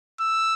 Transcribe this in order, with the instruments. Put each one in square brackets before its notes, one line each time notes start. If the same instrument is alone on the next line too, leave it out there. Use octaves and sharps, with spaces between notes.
[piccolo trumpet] E6